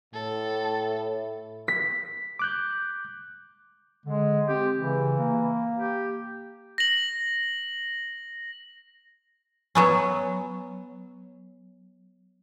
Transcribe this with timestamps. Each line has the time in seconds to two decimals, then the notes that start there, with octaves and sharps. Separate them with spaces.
0.14 A2 A4
1.68 B6
2.39 D6 F#6 G6
4.06 D3 G#3
4.49 C4 G4
4.76 C#3 E3
5.19 A#3
5.78 G4
6.78 A#6 F#7
9.75 F#3 B3 C#4